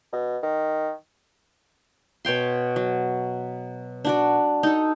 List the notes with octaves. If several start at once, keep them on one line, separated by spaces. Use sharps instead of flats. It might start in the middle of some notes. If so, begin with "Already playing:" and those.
B2
D#3
B2 C#5 G5 C6
F#3
D4 F#4 D5
D#4 A4